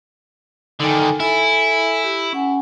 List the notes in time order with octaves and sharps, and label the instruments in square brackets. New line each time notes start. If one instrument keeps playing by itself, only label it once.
[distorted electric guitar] D3 D#3 [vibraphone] D#4 A4 G#5
[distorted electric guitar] E4 [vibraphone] A4 G#5
[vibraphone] G4
C#4 F#5 G#5